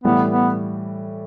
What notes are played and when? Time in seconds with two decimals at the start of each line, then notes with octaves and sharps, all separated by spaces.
0.04 A2 E3 G3 B3
0.31 B3